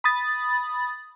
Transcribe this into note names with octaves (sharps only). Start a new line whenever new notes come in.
B5 D#6 A6